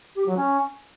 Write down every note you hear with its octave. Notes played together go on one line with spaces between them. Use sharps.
G4
F#3
C#4